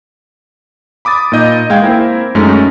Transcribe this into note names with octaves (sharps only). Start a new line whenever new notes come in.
B5 D6 D#6 A6
A#2 D#4 D#5 G6
G#3 F5 G5 G#6
A#3 C4 E4 A#4
F#2 G#3 A3 C#4 D#4